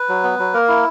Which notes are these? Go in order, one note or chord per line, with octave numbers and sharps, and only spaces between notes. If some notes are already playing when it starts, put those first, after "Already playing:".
Already playing: B4
F#3
B3
F#3
A#3 A#4
E4